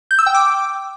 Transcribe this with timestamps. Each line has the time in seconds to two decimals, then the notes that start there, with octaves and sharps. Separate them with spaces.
0.11 G6
0.19 E6
0.26 G5
0.34 D6